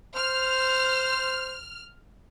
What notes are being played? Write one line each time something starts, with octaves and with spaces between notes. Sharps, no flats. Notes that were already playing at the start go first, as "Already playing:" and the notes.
C5 F6